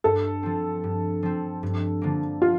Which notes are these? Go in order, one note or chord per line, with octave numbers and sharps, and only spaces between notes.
G2 A4
F3 C4
G2
F3 C4
G2
D3 F3 A#3
F4